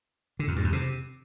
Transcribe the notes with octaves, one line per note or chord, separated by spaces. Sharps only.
D3
F2
G2
E2
C3